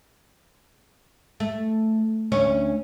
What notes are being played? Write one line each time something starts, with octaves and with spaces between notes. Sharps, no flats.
A3
D2 C#4 C#5